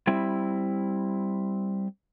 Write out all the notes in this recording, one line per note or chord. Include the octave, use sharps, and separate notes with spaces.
G3 C4 E4